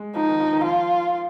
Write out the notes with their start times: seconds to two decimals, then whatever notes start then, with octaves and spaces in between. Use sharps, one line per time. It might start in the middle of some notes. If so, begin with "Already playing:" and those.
Already playing: G#3
0.16 F3 D#4
0.28 D#3
0.40 F3
0.53 D#3
0.64 F3 F4